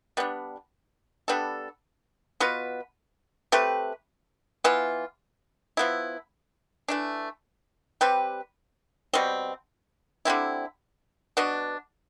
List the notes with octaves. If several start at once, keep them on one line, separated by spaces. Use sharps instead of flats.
G3 B3 D4
G3 B3 D4 A4
B2 B3 F4 B4
A3 C4 G4 B4
E3 B3 F4
F3 B3 E4
E3 A3 D4
G3 C4 G4 B4
B2 G3 C4
D3 G3 C4 E4
B2 B3 D4